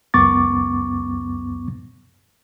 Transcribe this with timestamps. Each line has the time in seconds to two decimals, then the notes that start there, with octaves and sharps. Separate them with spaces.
0.14 C#2 F#2 B3 C#6 D6 A6